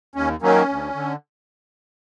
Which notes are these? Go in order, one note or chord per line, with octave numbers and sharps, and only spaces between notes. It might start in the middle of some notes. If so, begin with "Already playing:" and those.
D#2 C#4
D#3 F#3 A#3 C#4
D2
D3